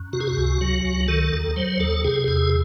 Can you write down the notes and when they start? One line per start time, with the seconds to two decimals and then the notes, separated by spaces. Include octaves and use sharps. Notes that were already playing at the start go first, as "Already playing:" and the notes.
Already playing: F#2
0.13 C3 F#4
0.20 G#4
0.28 F#4
0.37 C#2
0.61 F#3
0.85 C#2
1.08 D#3 A4
1.32 D#2
1.56 F#3 C5
1.80 D#2 A4
2.04 C3 G#4
2.28 E2 G#4